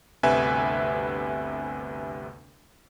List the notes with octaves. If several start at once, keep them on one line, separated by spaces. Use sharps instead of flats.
G1 D2 C3 B4 E5 G#5